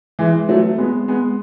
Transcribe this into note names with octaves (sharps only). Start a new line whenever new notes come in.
E3 G#3
F#3 A3
G#3 B3
G#3 B3